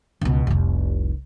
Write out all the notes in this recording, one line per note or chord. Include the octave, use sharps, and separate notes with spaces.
C#2 B2
F1 C2